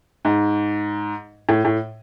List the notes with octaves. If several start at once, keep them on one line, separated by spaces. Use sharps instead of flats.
G#2
A2
A2